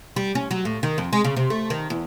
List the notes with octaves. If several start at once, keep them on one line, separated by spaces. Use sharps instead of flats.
G3
C#4
F#3
A2
D#3
F2
G#3
C#3
C3
A3
D#3
E2